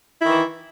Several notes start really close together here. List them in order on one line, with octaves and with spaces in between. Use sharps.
E4 D#3 E3